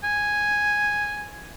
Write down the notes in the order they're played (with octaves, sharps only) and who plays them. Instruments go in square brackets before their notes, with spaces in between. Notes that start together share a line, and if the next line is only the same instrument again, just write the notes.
[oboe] G#5